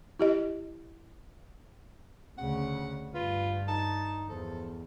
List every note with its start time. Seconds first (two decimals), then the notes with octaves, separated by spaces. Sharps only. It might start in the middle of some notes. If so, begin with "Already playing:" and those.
0.20 E4 G4 D#5
2.38 D2 C#3 F#5
3.15 G2 F4 B4
3.68 D#4 A5
4.29 E2 F3 A4